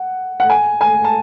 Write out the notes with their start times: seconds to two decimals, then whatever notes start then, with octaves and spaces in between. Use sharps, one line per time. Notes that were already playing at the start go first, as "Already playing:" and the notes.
Already playing: F#5
0.40 F#5
0.50 G#5
0.81 G#5
1.04 A5